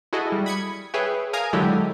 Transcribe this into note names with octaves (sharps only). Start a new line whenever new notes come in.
E4 F#4 G#4 A4 D#5
G3
B5 D#6 G#6 B6 C#7
G#4 B4 C#5 E5 G5
A#4 F5 G#5 A#5 D#6 G#6
D3 F#3 G#3 E4 G4 A4